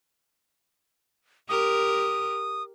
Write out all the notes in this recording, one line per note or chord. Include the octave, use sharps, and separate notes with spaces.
G4 A#4 D#6